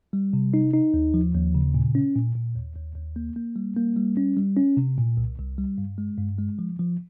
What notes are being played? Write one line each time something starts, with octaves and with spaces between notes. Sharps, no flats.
G3
C3
D#4
D#4
D#2
F3
D#2
C#3
A#2
C#4
A#2
A#2
D#2
D#2
D#2
A#3
A#3
G3
A#3
G3
C#4
G3
C#4
C3
A#2
C2
C2
G3
G2
G#3
G2
G#3
F3
F3